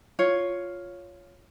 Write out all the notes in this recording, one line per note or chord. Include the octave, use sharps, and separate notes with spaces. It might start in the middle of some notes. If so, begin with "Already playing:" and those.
F4 C#5